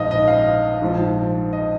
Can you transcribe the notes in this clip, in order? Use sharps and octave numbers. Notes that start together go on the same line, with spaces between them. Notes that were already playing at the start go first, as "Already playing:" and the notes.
Already playing: A#1 G#2 F3 D#5 F5
D#5
F5
A#1 G#2 F3
D#5